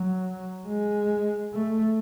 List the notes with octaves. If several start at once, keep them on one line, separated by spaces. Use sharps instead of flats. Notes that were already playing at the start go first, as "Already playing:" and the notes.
Already playing: F#3
G#3
A3